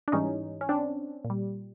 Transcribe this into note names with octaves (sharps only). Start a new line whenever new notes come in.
D4
G#2 E3 G3 C#4 D#4
C#4
C4 D4
A#2
G3